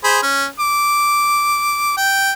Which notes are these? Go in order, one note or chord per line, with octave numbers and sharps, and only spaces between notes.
G#4 C5 B5
C#4
D6
G5